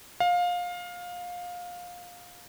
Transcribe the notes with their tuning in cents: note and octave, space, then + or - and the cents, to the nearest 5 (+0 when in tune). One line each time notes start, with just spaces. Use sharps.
F5 +20